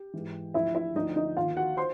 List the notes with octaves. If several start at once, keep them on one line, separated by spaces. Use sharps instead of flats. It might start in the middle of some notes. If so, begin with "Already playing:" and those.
Already playing: G4
G#2 E3
D2 D3 F3 E4 E5
E4 E5
D2 D3 F3 D#4 D#5
D#4 D#5
D#2 D#3 F4 F5
F#4 F#5
C5 C6